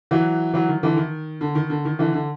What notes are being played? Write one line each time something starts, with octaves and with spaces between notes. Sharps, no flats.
E3 F#3
E3 F#3
D#3
D3 E3
D#3
D3
D#3
D3
D#3
D3 E3
D3